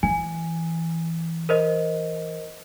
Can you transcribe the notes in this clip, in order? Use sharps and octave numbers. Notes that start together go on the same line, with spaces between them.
E3 G#5
A#4 C5 D#5